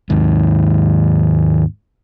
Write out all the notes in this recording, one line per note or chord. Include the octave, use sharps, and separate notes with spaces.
D#2 G#2